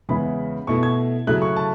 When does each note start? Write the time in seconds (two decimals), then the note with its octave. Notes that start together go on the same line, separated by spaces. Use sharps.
0.09 E2 C#3 G#3 B3 E4 B5
0.67 B2 A3 E4 C#6
0.83 G#6
1.27 C#3 F#3 A3 E4 F#6
1.42 C#6
1.56 A5